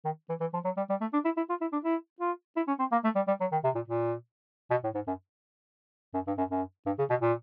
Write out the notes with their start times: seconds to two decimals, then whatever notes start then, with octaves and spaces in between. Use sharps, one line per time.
0.05 D#3
0.29 E3
0.40 E3
0.53 F3
0.64 F#3
0.77 G3
0.89 G3
1.01 A3
1.13 D4
1.25 E4
1.37 E4
1.49 F4
1.61 E4
1.72 D4
1.84 E4
2.20 F4
2.56 E4
2.67 C#4
2.79 C4
2.92 A#3
3.04 A3
3.15 G3
3.27 G3
3.40 F#3
3.52 D#3
3.64 C3
3.75 A#2
3.88 A#2
4.70 B2
4.84 A2
4.94 G#2
5.07 F#2
6.14 F#2
6.27 G2
6.38 F#2
6.51 F#2
6.86 G2
6.98 C#3
7.10 B2
7.21 A#2